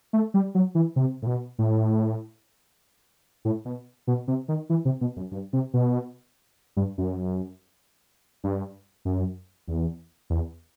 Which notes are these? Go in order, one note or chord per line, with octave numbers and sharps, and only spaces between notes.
A3
G3
F#3
E3
C3
A2
B2
A2
A2
B2
B2
C3
D#3
E3
C3
B2
F#2
G2
C3
B2
G2
F#2
G2
F#2
E2
E2